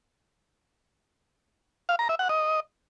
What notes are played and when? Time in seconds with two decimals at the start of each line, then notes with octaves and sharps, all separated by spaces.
1.89 F5
1.99 A#5
2.09 E5
2.19 F#5
2.29 D#5